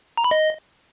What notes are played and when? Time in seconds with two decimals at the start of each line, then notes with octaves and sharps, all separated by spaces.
0.17 A#5
0.24 B5
0.31 D#5